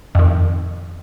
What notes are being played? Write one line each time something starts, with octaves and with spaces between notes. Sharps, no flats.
F2 D#3